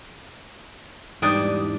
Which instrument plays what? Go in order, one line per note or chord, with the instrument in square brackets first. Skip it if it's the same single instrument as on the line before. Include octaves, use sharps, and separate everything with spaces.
[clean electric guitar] E2 G#2 E3 [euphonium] G3 [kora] D4 D#4 G5 [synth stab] D#6